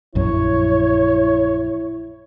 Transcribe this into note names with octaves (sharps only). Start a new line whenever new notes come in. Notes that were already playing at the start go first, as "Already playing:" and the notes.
A#1 F#2 F#3 E4 C#5